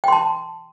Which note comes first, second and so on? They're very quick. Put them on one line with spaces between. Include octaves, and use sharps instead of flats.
G5 C6 A5